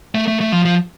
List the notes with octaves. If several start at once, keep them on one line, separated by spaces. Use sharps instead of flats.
A3
A3
A3
F3
F3